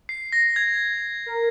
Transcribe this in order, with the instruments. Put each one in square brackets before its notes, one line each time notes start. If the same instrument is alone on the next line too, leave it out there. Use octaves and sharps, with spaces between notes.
[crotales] C7
A#6
G#6
[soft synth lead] A#4